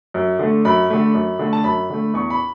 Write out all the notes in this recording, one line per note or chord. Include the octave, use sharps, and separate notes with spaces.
F#2
D3 A3
F#2 B5
D3 A3
F#2
D3 A3
A5
F#2 B5
D3 A3
E2 C#6
B5